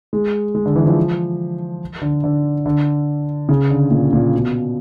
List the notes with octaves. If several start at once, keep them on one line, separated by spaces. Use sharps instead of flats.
G#3
G#3
D3
E3
F3
D3
D3
D3
C#3
D3
A#2
A#2
B2